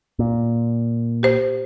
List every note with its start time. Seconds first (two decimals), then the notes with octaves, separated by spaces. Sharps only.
0.19 A#2
1.23 G4 C5